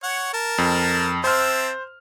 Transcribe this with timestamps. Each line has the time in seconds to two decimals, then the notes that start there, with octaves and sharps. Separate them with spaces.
0.03 C#5 F#5
0.33 A#4 A5
0.58 F2
1.24 C4 C5 E5 A5 F6